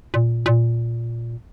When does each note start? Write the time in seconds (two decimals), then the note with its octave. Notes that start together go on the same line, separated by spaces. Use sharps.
0.14 A#2
0.46 A#2